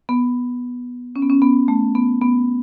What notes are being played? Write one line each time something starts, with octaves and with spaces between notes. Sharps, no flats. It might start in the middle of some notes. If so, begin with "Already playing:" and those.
B3
C#4
B3
C#4
B3
A3
B3
B3